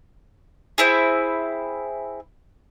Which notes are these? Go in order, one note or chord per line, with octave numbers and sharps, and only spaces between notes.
C4 E4 G#4